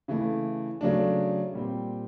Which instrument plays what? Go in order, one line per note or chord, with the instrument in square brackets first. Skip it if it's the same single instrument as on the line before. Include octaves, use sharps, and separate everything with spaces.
[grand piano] C#3 E3 A3
C#3 F#3 A3 D4
A#2 G3 C4